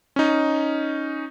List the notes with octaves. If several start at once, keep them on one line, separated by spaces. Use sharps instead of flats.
C#4 D#4